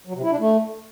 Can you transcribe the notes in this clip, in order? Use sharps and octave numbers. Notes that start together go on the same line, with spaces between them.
F#3
C3
E4
D4
A3